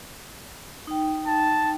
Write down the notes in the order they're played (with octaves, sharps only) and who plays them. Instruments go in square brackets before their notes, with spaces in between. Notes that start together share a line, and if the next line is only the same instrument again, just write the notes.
[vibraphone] D#4 G5
[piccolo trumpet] A5